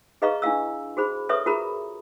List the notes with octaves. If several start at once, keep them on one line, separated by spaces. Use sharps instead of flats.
G#4 B4 D#5 F5 A#5 C#6
D4 E4 F5 E6
F#4 G#4 C5 B5
A4 B4 C#5 E5 C#6 D#6
F4 F#4 G#4 A#4 A#5 B5